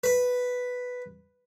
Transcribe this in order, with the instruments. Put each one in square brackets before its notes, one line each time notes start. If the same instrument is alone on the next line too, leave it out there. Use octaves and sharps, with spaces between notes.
[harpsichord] B4